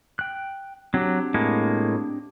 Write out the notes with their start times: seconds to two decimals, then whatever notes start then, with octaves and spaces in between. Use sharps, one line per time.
0.19 G5 F#6
0.94 F#3 C4 D4 G4
1.34 A2 G#3 A#3